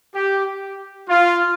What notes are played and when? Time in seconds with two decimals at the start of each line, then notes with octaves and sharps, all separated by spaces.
0.15 G4
1.09 F4